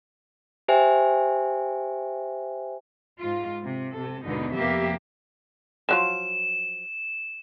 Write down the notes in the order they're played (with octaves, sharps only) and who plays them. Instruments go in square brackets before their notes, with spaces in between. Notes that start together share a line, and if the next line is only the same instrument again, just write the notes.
[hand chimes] G4 C5 E5 G5 G#5
[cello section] G#2 F4
C3
C3 A4
D#2 G#2 B2 D3 B3 D#4
F2 C3 A#3 B3 G4 E5
[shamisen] F3 F#3 F4 [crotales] E7